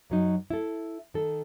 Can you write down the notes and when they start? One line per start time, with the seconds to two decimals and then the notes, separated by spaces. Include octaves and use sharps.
0.10 F#2 F#3 D#4
0.50 E4 A4
1.14 D#3 A4